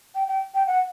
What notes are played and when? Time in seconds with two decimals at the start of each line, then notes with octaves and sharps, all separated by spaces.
0.15 G5
0.28 G5
0.54 G5
0.67 F#5